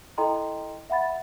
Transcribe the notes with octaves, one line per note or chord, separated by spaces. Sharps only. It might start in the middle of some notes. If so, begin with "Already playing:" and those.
E4 A4 D#5 G5 A#5 C6
E5 F#5 B5 A6